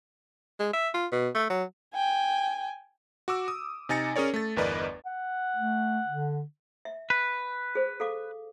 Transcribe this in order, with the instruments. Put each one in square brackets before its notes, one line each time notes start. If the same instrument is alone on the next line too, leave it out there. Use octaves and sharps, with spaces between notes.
[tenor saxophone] G#3
E5
F4
B2
A3
F#3
[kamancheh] G5 G#5
[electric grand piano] F#4 D6 E6
D#6
C3 D#4 G#5 A6 A#6 C#7
C#4 G#4 A#4 C#5 D5
A3 A6
G1 E2 A#4 B4 D5 D#5
[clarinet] F#5
[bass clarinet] A3
D3
[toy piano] E5
[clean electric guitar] B4
[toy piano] G#4 C5
A4 F5 D6